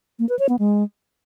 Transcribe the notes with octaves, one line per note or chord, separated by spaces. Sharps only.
A#3
B4
C#5
B3
G#3